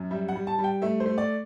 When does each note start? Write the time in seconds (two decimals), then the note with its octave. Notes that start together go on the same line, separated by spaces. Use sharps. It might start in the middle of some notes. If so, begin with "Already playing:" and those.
Already playing: F#2
0.11 G3 E5
0.29 F#5
0.35 G3
0.47 A5
0.58 G3
0.64 G5
0.82 A3 E5
1.00 C5
1.06 A3
1.18 D5